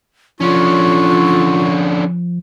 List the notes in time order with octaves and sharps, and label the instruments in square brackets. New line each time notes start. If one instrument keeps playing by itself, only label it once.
[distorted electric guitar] D3 C#4 [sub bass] F3 [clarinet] F4 [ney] C#6